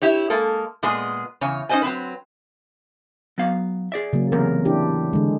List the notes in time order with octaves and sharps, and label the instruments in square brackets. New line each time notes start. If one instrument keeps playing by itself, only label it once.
[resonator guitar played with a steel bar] E4 G4 C#5
G#3 A#3 A4
A#2 G#3 B3 G#4
E2 C#3 C#5 G#5
C#4 D#4 A#4 C5 D#5 G#5
F#3 C4 B4
[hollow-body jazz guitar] F#3 B3 F5
G#4 D5 E5
[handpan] C#3 F#3 A#3
[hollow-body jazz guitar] E2 A2 C3 [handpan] A#4
[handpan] D4 E4 G4
D3 G#3